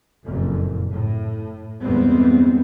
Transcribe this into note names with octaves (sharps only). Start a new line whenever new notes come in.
F#1 F2 A#2
A2
G1 E2 G3 G#3 B3 C4